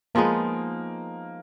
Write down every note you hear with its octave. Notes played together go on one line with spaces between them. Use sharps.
F3 G#3 A#3 B3 D#4